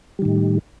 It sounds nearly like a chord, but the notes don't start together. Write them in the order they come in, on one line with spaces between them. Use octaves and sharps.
G3 D#3 A2